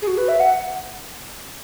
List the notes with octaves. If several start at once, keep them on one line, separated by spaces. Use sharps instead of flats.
G#4
F#4
B4
E5
F#5